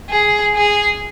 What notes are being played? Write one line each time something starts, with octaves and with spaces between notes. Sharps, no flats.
G#4
G#4